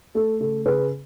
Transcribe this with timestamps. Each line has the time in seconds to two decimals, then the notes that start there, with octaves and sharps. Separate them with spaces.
0.15 A3 A4
0.40 C#3 A4
0.66 C#3 G#4 B4